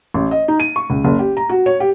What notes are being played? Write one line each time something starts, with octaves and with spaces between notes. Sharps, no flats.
A1
D#5
D#4
D#7
C#6
C#2
F#1
G4
A#5
F#4
C#5
G4